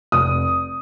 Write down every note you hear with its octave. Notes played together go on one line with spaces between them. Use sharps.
F1 D#6